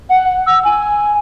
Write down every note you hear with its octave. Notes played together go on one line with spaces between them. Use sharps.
F#5
E6
G#5